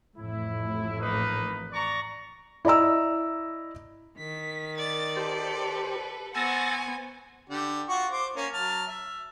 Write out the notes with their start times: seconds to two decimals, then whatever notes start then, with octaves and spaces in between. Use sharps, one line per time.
0.17 A1 F2 A2 E4
0.99 A#3 D#4 B4
1.72 D5 A#5 C#6
2.65 E4 D5 D#5 A#5 E6
4.18 D#3 B6
4.78 D5 A6
5.17 G4 A4 B4 C5
6.35 B3 C5 F#5 G#5 C#6 E6 A6 A#6
7.50 D3 G4
7.89 F4 F#4 C#6
8.12 C5 D6
8.36 A#3 C#4
8.54 F#3 A5 F6
8.88 E5